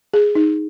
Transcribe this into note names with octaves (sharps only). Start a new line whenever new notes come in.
G#4
D#4